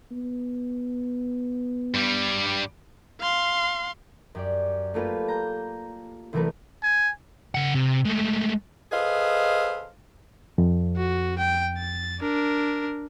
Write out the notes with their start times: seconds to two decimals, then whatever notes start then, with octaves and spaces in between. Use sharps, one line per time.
0.11 B3
1.94 G2 G3
3.21 F5 C6
4.35 F#2 G4 D5
4.94 A3 A#3 F4 G4 B4
5.28 A#5 G6
6.33 C2 E3 F#3 A3 A#4 B4
6.83 G#5
7.55 C#3 F#5
7.75 C3
8.05 G#3 A3
8.92 G#4 A4 B4 C5 D#5 F5
10.58 F2
10.97 F#4
11.39 G5
11.78 A6
12.20 D4 A#4